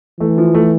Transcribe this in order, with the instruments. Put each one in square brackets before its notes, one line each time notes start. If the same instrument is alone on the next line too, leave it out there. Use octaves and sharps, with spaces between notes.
[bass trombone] E3 [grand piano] A3
[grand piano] F3
A3